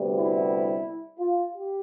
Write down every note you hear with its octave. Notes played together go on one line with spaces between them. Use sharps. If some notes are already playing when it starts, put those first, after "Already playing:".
Already playing: D2 C3 G3 B3
E4
F4
G4